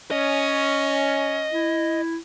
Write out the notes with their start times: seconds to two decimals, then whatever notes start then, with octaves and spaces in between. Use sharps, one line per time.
0.11 C#4 D#5
1.51 E4